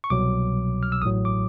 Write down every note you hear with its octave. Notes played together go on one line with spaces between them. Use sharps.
C#6
C2 B2 F#3 D6
F6
E6
A1 A2 F#3 D#6
D6